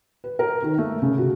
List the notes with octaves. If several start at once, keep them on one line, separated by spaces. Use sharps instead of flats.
B4
A#4
D#3
A3
C#3
F#4